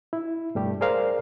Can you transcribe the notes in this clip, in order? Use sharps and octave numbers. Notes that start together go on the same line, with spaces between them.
E4
G2 B2 G3 A3 G4
G#4 A#4 C5 D5 F5 A#5